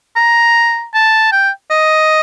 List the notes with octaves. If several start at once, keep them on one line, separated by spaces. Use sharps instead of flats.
A#5
A5
G5
D#5